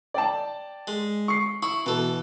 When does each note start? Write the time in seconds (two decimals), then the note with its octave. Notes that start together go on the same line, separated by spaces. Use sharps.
0.14 D5 G5 A5
0.87 G#3
1.28 C#6 C7
1.63 E4 C#6
1.86 B2 E3 A4